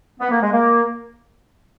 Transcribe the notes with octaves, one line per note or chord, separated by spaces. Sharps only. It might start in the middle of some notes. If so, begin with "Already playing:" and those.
B3
A#3
G#3
A#3